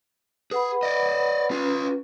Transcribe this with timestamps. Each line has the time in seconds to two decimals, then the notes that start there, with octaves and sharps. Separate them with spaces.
0.51 G#4 B4 F#5 B5
0.83 D5 D#5
1.51 C#4 F4 G#4 B4